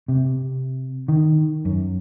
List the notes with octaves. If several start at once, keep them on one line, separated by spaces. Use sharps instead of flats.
C3
D#3
F#2